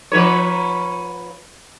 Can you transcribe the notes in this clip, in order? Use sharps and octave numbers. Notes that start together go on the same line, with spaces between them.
F3 B4 C#5